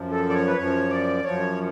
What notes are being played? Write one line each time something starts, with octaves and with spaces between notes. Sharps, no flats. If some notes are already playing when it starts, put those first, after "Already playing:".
Already playing: F#2 F3
A4
D5
C#5
B4
F#2 F3 C#5
D5
F#2 F3 C#5